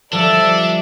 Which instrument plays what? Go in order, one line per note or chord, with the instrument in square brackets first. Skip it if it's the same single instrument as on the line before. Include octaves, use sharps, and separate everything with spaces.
[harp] F3 G3 [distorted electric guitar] D4 [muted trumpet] A4 [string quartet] D5 E5